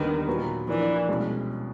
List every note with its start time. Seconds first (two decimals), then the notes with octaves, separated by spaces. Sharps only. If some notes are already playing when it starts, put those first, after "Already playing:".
Already playing: D#2 D3 D#3 G3 B3 D#4
0.27 A#2 F#3 B3
0.67 E3 F3 A#3 D4
1.09 C2 B2 G#3 C#4